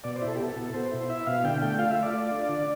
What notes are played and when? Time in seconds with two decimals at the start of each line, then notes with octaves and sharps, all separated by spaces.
0.04 B2 D5
0.16 C5
0.22 E4
0.27 A4
0.35 G4
0.40 B2 A4
0.56 B2
0.74 B2 C5
0.91 E4
1.09 E4 E5
1.27 B2 F5
1.44 D3 G5
1.62 A3 G5
1.79 F4 F5
1.91 E5
1.97 A3
2.03 D5
2.14 F4
2.31 D4
2.49 D3